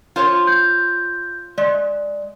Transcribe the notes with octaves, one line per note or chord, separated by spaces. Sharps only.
F4 C5 C#5
G6
G#3 D5